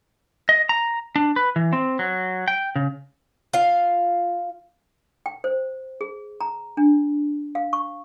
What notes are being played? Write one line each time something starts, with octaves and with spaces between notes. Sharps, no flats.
D#5
A#5
D4
B4
E3
C4
F#3
G5
C#3
F4 F5
G5
C5
G#4
A#5
D4
F5
C#6